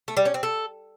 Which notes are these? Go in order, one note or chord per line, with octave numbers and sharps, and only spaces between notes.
A3
G3
C#4
C4
A4